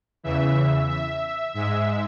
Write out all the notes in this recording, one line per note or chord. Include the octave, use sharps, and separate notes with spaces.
E2 C#3 E3 E5
E5
G#2 G#3 E5